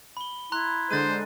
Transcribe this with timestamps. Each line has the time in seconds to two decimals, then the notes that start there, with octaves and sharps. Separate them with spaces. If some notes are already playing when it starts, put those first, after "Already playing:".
0.17 B5 G7
0.52 E4 A#5 C6 F#6
0.91 D3 G#3 C5 A6 D#7